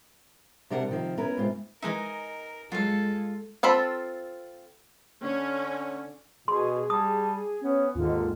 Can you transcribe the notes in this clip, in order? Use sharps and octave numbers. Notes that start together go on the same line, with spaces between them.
C3 G3 D4 A#4 F#5
C3 D#3 F3
B3 C#4 E4 A#4
G#2 C3 F4
E3 G#3 D#4 A#4 D#5 E5 G#5
F#3 G#3 F4 A4 F5
C4 F4 A4 B5
D3 C#4
B2 G#4 C6
G3 A5 D#6
B3 C#4
D#2 G#2 D3 D#3 F4